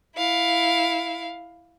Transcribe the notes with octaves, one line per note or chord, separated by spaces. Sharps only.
E4 F5